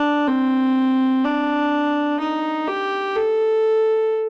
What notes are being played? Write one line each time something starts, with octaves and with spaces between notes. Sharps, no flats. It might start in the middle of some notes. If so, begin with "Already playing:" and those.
Already playing: D4
C4
D4
D#4
G4
A4